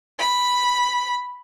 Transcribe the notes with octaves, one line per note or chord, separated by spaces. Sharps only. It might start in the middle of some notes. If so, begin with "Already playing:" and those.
B5